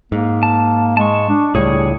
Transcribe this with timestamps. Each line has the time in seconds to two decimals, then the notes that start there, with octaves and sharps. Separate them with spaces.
0.12 G#2 A#3
0.43 A5
0.97 G#3 A5 C#6
1.29 D4
1.55 C#2 A2 G3 G#4 C#5